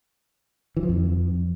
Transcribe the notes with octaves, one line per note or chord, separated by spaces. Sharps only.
E3
F3
F2